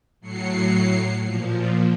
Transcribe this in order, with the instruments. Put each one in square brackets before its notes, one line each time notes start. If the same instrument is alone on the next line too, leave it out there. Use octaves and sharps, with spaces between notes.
[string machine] A2 F#3 C7 C#7
A#2 F3